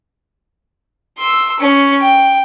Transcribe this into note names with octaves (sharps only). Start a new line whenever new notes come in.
C6 E6
C#4
G5